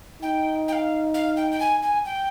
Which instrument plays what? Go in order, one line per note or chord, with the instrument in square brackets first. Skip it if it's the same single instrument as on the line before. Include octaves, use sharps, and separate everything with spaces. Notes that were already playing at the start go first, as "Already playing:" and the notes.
[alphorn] D#4 [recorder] G5
[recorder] G5
F5
F5
G5
G5
G#5
G#5
G5